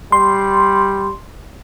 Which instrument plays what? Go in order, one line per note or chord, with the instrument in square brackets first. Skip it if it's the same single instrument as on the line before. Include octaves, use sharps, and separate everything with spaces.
[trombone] G3 [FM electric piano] C6